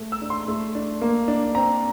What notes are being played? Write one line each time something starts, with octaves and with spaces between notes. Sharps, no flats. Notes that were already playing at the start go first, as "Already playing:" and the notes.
Already playing: A3
E6
D4
C6
A3
D4
A#3
D4
C4 A#5